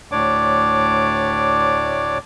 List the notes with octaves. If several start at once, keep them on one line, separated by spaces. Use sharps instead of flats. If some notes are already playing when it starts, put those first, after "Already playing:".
D2 A2 D4 C#5 D5 D6